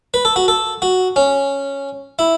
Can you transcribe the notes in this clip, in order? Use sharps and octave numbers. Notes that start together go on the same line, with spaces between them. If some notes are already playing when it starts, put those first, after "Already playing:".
B4
A4
F#4
A4
F#4
C#4
E4